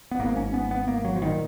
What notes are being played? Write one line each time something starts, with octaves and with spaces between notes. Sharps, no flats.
B3
G#1 G#2 A#3
C#4
B3
B3
A#3
F#3
F3
A#2 D#3